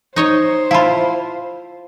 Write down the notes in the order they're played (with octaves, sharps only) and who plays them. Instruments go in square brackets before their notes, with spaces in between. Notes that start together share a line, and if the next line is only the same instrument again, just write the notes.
[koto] D#4 C#5 D#5 [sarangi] C5
[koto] E4 F4 [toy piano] F5 A5 B5